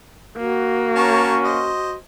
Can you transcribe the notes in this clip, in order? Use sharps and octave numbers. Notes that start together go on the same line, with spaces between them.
A#3 F#4
C#4 C#5 A5 A#5
C5 D#5